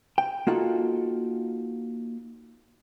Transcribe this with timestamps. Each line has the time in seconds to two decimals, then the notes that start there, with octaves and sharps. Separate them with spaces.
0.18 G5
0.47 A#3 D#4 F4 F#4 A4 F#5